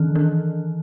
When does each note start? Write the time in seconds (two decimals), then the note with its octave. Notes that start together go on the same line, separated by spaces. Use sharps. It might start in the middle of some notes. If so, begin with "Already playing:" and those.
Already playing: D#3 E3
0.16 E3